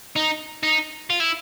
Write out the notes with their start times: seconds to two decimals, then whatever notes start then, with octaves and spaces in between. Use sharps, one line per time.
0.16 D#4
0.63 D#4
1.10 F4
1.20 E4